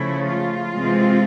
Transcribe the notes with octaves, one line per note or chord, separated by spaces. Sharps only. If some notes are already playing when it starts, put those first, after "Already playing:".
Already playing: C#3 F3 A3 E4
F4
C3 E3 G#3 C4